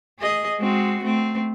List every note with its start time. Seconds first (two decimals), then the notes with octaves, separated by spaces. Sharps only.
0.19 G#4 D#5
0.60 G#3 C4 F#4
1.03 A3 C4